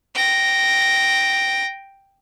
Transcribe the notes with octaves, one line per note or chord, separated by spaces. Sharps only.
G5 A#6